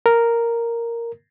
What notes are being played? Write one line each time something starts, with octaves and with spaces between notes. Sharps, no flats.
A#4